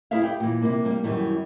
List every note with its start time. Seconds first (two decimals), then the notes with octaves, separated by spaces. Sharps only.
0.11 E4 G#4 B4 E5 F5
0.24 G4 G5
0.40 A#2 E3
0.62 C3 A#3
0.85 G3 A#3
1.04 F#2 D#3 E3 G3